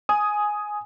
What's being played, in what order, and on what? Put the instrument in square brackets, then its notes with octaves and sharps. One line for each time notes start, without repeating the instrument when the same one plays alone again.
[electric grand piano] G#5 D#6